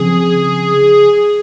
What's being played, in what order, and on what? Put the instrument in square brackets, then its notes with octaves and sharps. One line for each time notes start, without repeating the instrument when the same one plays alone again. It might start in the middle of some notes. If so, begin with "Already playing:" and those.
Already playing: [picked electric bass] C#3 F3 C4 [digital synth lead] G#4